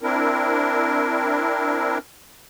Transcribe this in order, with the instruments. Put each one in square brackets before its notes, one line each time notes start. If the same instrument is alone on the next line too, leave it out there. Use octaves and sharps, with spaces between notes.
[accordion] C4 D4 E4 A#4